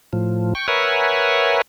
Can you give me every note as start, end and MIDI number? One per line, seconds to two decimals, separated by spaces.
0.13 0.54 45
0.13 0.54 53
0.55 0.67 79
0.55 0.67 85
0.68 1.62 70
0.68 1.62 71
0.68 1.62 73
0.68 1.62 76
0.68 1.62 78
0.68 1.62 80